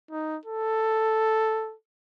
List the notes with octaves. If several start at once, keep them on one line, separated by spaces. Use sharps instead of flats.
D#4
A4